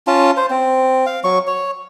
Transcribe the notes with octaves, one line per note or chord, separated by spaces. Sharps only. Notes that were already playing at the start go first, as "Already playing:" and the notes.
C#4 F4 A5
C5
C4
F5
F#3 C#6
C#5